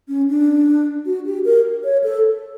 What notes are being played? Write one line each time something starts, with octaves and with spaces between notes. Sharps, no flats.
C#4
D4
F#4
G4
A#4
C#5
A4